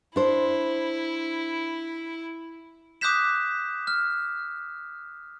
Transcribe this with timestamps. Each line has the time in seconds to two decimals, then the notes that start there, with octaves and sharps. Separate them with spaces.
0.16 D4 E4 C5
3.01 D6 D#6 F#6 G6 B6 E7
3.87 F6